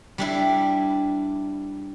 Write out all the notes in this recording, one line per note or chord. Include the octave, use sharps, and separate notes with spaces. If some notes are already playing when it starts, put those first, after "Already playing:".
G3 D4 E4